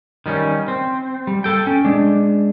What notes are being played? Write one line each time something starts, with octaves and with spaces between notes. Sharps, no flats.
D#3 G3 A#3 C#4
C4
G3
A4 G5
C#4
G#3 D4